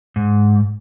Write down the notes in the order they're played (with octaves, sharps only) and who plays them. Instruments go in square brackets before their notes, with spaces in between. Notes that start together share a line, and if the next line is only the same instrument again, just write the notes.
[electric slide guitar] G#2